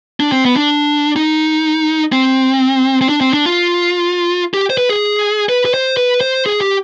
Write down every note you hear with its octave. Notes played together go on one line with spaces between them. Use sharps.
D4
C4
B3
D4
D#4
C4
C4
D4
C4
D4
F4
G4
C5
B4
G#4
B4
B4
C5
B4
C5
G#4
G4